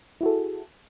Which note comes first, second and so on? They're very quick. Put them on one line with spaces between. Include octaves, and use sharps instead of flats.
E4 F#4 A4 G#4